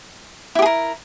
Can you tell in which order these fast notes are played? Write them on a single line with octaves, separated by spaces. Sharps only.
E4 G4 G#4 A#4